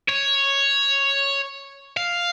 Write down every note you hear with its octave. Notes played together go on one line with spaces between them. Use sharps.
C#5
F5